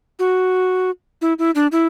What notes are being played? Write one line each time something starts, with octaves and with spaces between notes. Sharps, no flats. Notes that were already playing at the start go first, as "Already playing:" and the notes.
F#4
E4
E4
D4
E4